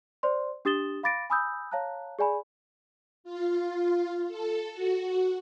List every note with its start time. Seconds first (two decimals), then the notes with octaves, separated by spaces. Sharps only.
0.23 C5 D5 C6
0.65 D4 G4 D#6 A6 E7 G7
1.03 F5 B5 D6 A6 A#6 D7
1.30 G#5 B5 D#6 E6 G6
1.72 C#5 F5 A5 A#5 F#6
2.19 G#4 D5 G#5 B5
3.24 F4
4.28 A4
4.73 F#4